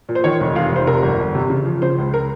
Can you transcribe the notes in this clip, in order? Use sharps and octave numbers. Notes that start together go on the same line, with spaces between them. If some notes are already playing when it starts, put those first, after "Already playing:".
A#2
C5
D#3 C#5
F1
F1 F5
F1 C5
C3 A#4
G1
G1
C3
C#3
F3
C#3 C5
C#2
A#4